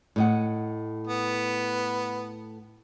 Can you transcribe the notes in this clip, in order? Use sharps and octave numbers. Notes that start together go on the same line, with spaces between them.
A2 D#5 F#5
B3